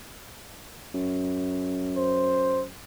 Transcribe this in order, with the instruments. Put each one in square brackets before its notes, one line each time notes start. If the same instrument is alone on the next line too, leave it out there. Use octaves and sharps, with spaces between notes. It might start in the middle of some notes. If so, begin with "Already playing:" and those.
[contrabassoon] F#2
[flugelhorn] C5